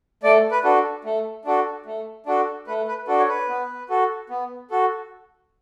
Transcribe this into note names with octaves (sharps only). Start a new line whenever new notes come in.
A3 D5
B4
D4 F#4 A4
A3
D4 F#4 A4
A3
D4 F#4 A4
A3 B4
B4
D4 F#4 A4
C#5
B4
B3
F#4 A4
B3
F#4 A4